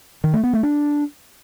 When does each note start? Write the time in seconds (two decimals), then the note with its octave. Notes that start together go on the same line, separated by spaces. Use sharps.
0.24 D#3
0.34 A3
0.43 B3
0.53 A3
0.63 D4